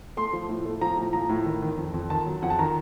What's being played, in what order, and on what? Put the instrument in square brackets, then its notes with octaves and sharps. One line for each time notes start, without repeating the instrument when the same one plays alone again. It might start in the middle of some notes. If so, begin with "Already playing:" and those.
[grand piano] A3 C6
F3
A2
A3
F3 A#5
A2
F3 A#5
A2
D#3
D#3
F2
F2
D#3 A5
F#3
F2 F#5
A5
D#3 A#5